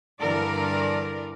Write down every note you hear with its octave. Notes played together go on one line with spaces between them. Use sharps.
G2 D3 E3 A#4 D5